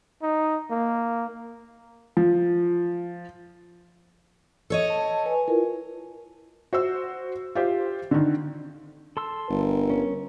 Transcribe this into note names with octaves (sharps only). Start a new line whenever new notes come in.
D#4
A#3
F3
A4 C#5 D#5
A5
B4 G#5
E4 F4 A#4
F#4 C5 E6
F4 G4 C5
D3 D#3
A4 C6 E6
G1 A#4
C#4